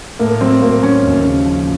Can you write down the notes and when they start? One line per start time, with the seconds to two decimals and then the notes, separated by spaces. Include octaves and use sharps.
0.19 A2 A#3
0.41 F#3 C4
0.62 A2 A#3
0.83 F#3 C#4
1.04 D#2
1.25 C#3
1.46 F3